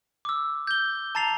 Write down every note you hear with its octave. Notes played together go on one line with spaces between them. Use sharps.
D6 E6
G6 G7
A5 A#5 A6 C7 F7